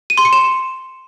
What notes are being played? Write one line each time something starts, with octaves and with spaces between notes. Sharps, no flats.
D#7
C6
C#7
E7